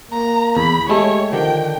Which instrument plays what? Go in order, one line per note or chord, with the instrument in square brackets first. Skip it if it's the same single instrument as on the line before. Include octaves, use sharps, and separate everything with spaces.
[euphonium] A#3 [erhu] A#5
[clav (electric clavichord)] E2 [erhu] B5
[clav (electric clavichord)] G#3 A3 A4 [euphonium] G4 [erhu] C#5
[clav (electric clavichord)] D3 D#3 D4 [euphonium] F3 [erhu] G5